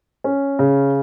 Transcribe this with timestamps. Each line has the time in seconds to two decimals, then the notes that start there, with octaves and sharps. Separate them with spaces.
0.24 C#4
0.59 C#3